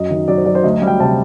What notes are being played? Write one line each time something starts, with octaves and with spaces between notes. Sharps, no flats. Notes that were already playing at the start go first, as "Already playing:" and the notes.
Already playing: F#2 F#3 D#5
D#3
F#3 D5
C5
F#3 D5
C5
D2 D#5
G3
G5
C3 A5